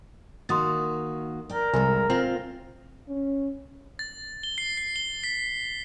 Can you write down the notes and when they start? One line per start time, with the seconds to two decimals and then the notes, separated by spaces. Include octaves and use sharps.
0.49 D#3 A#3 F#4 C6 D#6 A6
1.50 A#4 D5 G5
1.74 C2 G#3 A4 G#5
2.10 C4 F4
3.07 C#4
3.99 A6
4.43 G7
4.58 C7
4.77 C7
4.96 G7
5.24 B6